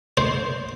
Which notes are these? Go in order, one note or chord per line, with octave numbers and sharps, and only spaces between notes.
C5